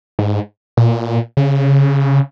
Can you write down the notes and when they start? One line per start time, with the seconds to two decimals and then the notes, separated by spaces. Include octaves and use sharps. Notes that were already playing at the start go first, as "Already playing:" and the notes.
0.19 G#2
0.77 A#2
1.37 C#3